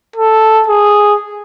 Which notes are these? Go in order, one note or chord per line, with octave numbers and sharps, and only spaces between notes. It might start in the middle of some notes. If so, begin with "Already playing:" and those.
A4
G#4